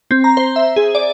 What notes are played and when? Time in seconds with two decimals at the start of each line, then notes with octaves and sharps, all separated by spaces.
0.11 C4
0.24 A#5
0.37 C5
0.56 E5
0.76 G#4
0.95 D5